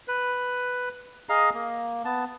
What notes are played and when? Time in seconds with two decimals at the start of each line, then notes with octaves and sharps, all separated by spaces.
0.08 B4
1.29 G#4 D#5 F5 A#5
1.54 A#3
2.05 B3 A5